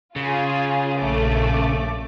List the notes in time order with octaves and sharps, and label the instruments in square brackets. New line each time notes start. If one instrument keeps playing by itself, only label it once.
[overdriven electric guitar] C#3 [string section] F4 G#4
[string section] A#1 A3 D6